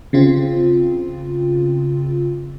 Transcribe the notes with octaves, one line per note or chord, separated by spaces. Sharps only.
C#3 C4 F4